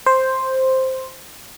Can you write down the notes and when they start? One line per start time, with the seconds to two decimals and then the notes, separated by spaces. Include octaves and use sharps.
0.06 C5